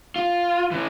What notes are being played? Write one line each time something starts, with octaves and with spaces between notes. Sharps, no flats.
F4
E3 C#4